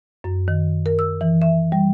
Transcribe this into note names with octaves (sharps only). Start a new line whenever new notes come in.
F#2
D#3
A#4
E6
E3
E5
G3